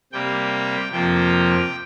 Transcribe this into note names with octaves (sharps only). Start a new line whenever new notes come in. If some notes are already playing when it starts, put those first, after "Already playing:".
C3 G3 A#3 G5
F2 C3 F3 A#3 G5